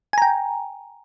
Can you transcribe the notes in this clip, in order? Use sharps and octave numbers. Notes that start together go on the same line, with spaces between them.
G5 G#5 A#5